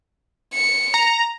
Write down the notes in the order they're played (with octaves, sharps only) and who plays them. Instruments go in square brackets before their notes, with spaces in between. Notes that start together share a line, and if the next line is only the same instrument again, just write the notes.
[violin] C#7
[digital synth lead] A#5